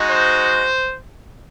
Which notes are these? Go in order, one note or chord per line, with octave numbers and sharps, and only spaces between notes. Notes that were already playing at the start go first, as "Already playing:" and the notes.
Already playing: G#3 D#4 F#4
C5